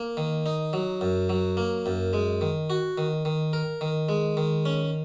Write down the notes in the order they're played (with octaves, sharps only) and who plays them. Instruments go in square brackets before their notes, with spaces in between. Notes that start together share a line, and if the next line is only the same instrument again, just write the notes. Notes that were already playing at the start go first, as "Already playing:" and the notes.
Already playing: [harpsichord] A#3
D#3
D#4
F#3
F#2
F#3
A#3
F#2
G#3
D#3
F#4
D#3
D#3
A#4
D#3
G#3
D#3
C#4